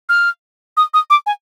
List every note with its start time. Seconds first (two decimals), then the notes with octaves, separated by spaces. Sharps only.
0.09 F6
0.77 D#6
0.94 D#6
1.10 D6
1.26 G#5